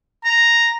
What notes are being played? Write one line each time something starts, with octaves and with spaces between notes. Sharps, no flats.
A#5